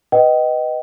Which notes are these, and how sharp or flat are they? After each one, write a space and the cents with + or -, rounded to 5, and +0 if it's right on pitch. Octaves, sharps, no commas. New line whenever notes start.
B4 +0 D#5 +0 G5 -35